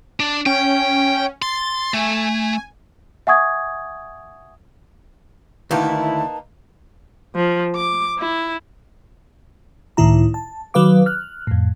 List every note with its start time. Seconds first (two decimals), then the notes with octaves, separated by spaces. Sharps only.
0.20 D4
0.46 C#4 G5
1.42 C6 A6
1.94 A3 G#5
3.27 E5 F#5 G#5 C#6 D#6 G#6
5.71 D2 D#3 A#3 D#4 E4 B4 A5
7.35 F3
7.75 D6
8.19 E4
9.97 C#2 A2 D#3 E4 A#5
10.34 A5
10.74 D#3 F#3 B4 F5 D6
11.06 F6 F#6
11.47 F2 A2